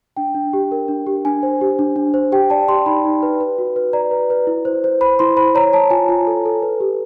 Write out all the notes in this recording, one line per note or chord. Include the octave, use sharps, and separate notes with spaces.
D4 G5
D4
G4
A#4
D4
G4
D4 G#5
C5
G4
D4
D4
C5
G4 G5
D5 A5
G4 C6
D#4 B5
D#4
B4
B4
F#4
B4
D5 A#5
B4
B4
E4
C5
C5
C5 B5
E4 C6
C5 B5
C#5 A#5
C#5 A5
F4 G#5
F4
A4
A4
B4
G4